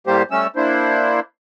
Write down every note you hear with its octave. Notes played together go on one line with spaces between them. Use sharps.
A2 G3 A#3 G4 C5
G3 A3 C#4 E6
A#3 D4 E4 C5